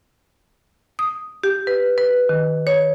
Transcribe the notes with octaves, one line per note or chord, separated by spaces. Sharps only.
D#6
G4
B4
B4
D#3
C#5